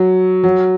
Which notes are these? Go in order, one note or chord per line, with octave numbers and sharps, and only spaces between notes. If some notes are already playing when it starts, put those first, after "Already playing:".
Already playing: F#3
F#3